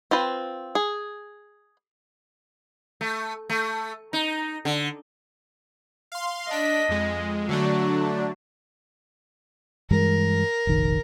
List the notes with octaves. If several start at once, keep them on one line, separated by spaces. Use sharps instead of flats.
C4 F4 B4 G5
G#4
A3
A3
D#4
D3
F5 C6
D4 D#5 B6
F2 G#3
D3 F#3 A3 D4
G2 E3 G#3 A#4
F1 A#1 D#3